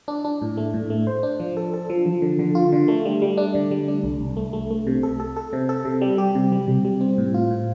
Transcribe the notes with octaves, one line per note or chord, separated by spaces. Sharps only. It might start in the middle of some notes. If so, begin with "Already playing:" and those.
D4
D4
A2
A3
A2
A3
C5
D4
F3
A4
A4
F3
F3
D3
D3
F4
D3
A3
G3
G3
D4
D3
G3
D4
C2
C2
A3
A3
A3
C3
A4
A4
A4
C3
A4
C3
G3
G4
C3
G3
C3
G3
C4
A2
F4
A2